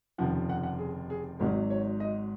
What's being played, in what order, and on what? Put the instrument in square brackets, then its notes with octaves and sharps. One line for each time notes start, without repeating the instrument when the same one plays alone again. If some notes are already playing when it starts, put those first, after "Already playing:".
[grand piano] F1 D#2 C#3 F3 F#5
F#5
F#5
G#4
G#4
G#1 G#2 F#3 A#4
C#5
D#5